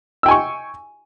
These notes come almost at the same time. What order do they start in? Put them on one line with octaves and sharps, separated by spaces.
E6 G5 G#5 C#6